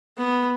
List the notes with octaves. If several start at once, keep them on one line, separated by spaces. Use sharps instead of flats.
B3